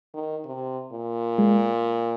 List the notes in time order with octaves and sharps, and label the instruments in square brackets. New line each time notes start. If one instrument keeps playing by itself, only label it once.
[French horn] D#3
C3
A#2
[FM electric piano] G#3